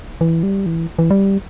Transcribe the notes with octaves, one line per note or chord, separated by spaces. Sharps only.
E3
G3
E3
E3
G3